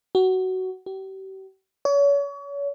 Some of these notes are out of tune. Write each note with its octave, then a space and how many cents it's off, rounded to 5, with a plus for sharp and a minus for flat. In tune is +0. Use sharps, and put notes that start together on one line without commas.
F#4 +15
G4 -40
C#5 +35